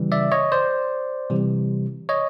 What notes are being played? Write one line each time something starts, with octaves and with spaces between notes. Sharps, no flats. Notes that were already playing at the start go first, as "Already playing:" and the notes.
Already playing: C#3 E3 G3
D5 E5
C#5 D#5
C5 D5
C3 E3 G3
C#5 D#5